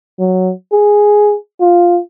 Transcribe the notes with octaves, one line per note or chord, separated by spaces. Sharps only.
F#3
G#4
F4